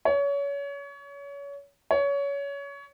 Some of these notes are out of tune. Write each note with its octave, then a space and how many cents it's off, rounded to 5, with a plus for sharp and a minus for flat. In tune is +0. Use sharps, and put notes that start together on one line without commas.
C#5 +30
C#5 +25